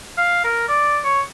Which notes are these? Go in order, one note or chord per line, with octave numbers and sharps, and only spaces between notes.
F5
A#4
D5
C#5